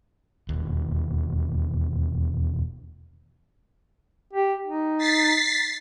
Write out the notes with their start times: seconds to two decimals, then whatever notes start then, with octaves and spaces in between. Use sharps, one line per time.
0.49 E1 D#2
4.33 G4
4.67 D#4
4.98 A6 B6 C7